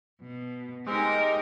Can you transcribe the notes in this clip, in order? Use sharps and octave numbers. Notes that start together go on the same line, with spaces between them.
B2
G#3 C4 D#4 G4 A#4